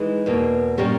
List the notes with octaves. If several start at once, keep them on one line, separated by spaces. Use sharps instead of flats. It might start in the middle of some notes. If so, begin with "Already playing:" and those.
Already playing: E3 G#3 D#4
E2 B2 A#3
A#2 G3 C#4 G4 A#4